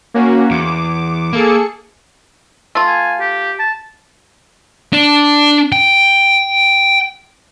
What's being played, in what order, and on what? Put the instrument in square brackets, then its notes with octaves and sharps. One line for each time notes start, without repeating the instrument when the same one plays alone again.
[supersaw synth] A#3 C#4 F#4
[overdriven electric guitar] E2 [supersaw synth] D6
[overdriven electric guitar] A#3 [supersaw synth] G#4 A4 C#7
[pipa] A3 F4
[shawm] G#5
G4
A5
[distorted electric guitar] D4
G5